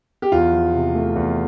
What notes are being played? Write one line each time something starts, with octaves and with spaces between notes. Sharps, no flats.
G4
E2 F4
F3
C3
A3
E2